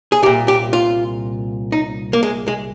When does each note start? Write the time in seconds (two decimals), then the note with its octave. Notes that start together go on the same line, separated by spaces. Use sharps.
0.12 G#4
0.23 C2 G4
0.26 A#2
0.48 G4
0.73 F4
1.72 D#4
2.13 A#3
2.23 G#3
2.48 G#3